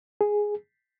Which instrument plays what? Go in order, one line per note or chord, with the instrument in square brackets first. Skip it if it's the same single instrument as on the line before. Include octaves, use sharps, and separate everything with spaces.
[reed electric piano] G#4